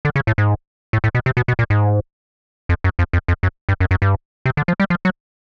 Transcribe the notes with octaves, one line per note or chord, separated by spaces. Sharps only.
D3
C#3
A2
G#2
A2
A2
B2
C3
B2
B2
A#2
G#2
F2
F#2
F2
F2
F2
F#2
G2
F#2
F#2
G2
C3
D3
F3
G3
F3
F#3